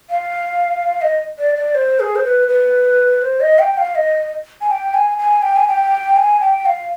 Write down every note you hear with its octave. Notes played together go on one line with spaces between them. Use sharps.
F5
D#5
D5
D5
C5
G#4
C5
B4
B4
C5
D#5
G5
F5
D#5
G#5
G5
G#5
G#5
G5
G#5
G5
G#5
G5
F5